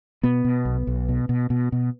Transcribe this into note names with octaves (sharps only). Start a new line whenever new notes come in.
B2 B3
B2
B1
B1
B2
B2
B2
B2